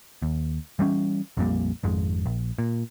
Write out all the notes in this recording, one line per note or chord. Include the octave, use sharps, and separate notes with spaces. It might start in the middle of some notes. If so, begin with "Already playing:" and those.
D#2
E3 G3 A#3 C#4
A#1 F2 A#2 G3
G#1 F2 G#3
A#1
A#2